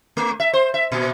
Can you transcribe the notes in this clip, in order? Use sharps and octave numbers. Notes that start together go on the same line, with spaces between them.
A3
E5
C5
E5
A#2